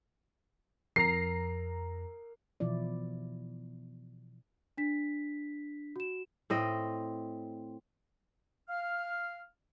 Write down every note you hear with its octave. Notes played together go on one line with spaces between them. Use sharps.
F2 A#4 A#5 C7
B2 E3 F3 E4 D5
D4 B6
F#4 E7
A2 C4 D#5
F5 F6